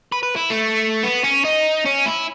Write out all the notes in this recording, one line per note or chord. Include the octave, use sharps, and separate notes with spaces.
B4
B4
E4
A3
B3
C#4
D#4
C#4
E4